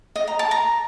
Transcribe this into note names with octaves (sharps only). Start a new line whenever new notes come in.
D#5
A#5
A5
A#5